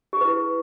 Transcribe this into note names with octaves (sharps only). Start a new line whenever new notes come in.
E4 G4 G#4 B4